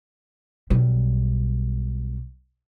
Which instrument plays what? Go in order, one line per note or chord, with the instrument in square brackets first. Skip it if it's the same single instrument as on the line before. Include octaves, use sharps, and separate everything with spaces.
[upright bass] B1 G3